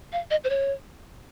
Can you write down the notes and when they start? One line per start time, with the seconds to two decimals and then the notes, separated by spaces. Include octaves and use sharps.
0.13 F5
0.31 D#5
0.44 C5
0.50 C#5